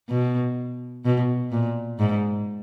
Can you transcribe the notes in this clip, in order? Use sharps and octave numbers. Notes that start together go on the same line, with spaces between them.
B2
B2
A#2
G#2